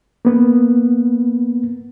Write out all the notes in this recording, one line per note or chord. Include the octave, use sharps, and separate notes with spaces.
A#3 B3